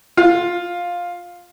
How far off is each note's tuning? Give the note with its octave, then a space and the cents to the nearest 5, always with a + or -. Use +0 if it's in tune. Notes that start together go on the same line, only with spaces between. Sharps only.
F4 +10